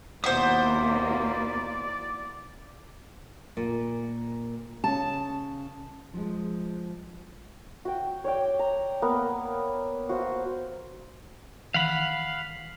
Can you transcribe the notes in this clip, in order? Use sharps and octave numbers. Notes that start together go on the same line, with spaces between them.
D#2 B2 A#3 E4 C5 D5 F#5 D#6
A#2
C#3 C#4 A5
F3 G#3
F#4 G5
C#5 D5 G5
A#5
A#3 B3
F#4 C5 F5
D#3 E3 F5 F#5 B5